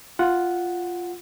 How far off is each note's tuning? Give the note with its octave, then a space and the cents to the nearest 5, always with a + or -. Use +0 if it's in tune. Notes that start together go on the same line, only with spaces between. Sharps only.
F4 +0 F#5 +0